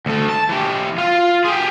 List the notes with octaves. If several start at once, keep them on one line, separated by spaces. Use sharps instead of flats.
D2 A3
A5
E3 G4
F4
G4 G#4